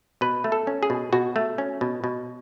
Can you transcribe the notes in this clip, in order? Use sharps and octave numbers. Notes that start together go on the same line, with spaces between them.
B2 B4
A3
A4
C#4
G#4
B2
B2 F#4
A3
C#4
B2
B2